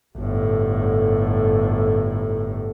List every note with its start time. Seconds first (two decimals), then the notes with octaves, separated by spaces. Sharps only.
0.17 G1 A2